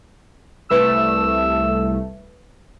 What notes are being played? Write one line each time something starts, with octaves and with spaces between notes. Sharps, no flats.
C2 A3 B4 E6